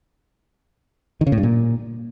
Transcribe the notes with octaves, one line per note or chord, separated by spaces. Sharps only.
D#3
C#3
A2
G2
A#2